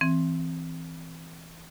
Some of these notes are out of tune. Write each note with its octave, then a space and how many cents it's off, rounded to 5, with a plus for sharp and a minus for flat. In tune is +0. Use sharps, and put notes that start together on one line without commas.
E3 +0 C4 +0